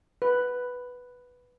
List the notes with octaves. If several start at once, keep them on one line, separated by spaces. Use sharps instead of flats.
B4